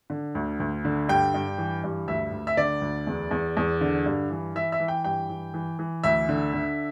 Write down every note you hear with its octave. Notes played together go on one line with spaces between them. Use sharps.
D3
D2
D2
D3
G2 G5
G2
E3
G2
D2 E5
D2
E5
D3 D5
D2
E2
E2
E2
D3
G2
E3
E3 E5
E5
E3
G5
G2 G5
E3
E3
E3
D2 E5
D3
D3